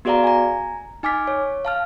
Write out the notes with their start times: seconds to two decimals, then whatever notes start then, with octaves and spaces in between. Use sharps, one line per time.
0.05 B3 F#4 G#4 D5 F5 A#5
0.24 G#5 A#5
1.03 D#4 G#5 D6 F6 B6
1.27 C#5
1.65 F5 A5 F6